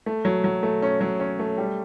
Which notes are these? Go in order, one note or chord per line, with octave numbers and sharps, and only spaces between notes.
A3
F#3
F#3
A3
C#4
F#3
C#4
A3
G3